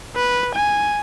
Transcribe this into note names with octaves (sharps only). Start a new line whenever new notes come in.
B4
G#5